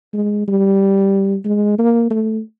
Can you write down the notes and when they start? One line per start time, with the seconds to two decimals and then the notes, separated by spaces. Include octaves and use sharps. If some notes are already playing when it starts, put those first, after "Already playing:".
0.14 G#3
0.48 G3
1.45 G#3
1.79 A#3
2.10 A3